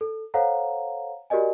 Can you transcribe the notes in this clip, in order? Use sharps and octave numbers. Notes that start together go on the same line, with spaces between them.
A4
A4 C5 C#5 F5 F#5 A#5
F#4 G4 A#4 D5 D#5 G#5